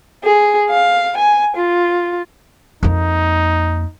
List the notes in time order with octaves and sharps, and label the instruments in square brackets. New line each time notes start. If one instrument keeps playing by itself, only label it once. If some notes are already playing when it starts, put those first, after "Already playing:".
[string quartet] G#4
F5
G#5
F4
[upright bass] F2 A#3 [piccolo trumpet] D#4